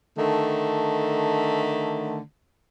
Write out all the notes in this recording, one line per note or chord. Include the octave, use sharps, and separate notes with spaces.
D3 D#3 A3